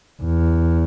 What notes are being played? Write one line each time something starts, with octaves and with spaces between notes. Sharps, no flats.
E2